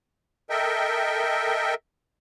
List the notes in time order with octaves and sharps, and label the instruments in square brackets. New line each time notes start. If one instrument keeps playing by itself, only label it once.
[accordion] A4 A#4 D#5 E5 G5